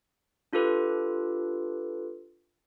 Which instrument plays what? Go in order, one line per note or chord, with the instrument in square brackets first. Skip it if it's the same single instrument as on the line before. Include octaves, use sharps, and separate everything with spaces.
[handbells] D4 F4 G4 A4 B4